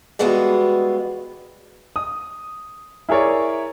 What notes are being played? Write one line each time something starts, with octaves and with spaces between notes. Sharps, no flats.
E3 G3 G#3 B3 F4 F#4
D#6
E4 G#4 A#4 C#5 D5